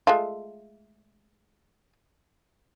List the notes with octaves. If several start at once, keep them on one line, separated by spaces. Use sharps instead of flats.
G#3 A3 F4